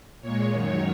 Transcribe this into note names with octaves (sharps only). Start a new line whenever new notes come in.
A#2 G#3 C#5
F#2 D#3 F#3